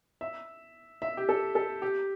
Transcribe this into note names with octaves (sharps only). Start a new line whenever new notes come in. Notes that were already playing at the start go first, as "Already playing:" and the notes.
E5
E5
G4
A4
A4
G4